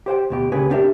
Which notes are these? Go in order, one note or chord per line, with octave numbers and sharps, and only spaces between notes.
G4 C5 F#5 G5
D2 B2 G4
C#2 C#3 A#3 G4 G#4 B4
B3 C4 D4 G4 A#4 E5